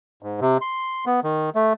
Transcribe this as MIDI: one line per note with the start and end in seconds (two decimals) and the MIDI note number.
0.22 0.40 44
0.41 0.57 48
0.61 1.05 84
1.06 1.20 59
1.24 1.50 51
1.55 1.73 57